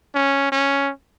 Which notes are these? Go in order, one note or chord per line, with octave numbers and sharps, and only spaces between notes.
C#4
C#4